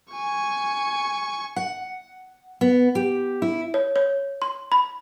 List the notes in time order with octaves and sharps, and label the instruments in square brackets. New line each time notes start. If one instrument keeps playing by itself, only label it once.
[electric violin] G#5 C#6
[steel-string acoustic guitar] F#5
B3
G4
E4
[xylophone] C#5
C#5
C6
B5